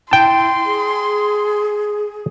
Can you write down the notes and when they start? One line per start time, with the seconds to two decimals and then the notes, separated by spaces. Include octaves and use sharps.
0.11 E4 G5 A5 C6
0.66 G#4